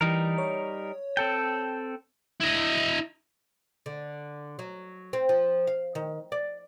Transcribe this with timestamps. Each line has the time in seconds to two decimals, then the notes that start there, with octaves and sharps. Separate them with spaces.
0.01 E3 G3 D#4 A#4
0.38 C#5
1.17 C4 A4 G5
2.40 E4 D#5
3.86 D3
4.59 F#3
5.13 C4
5.29 F3
5.67 F5
5.95 D#3
6.32 D5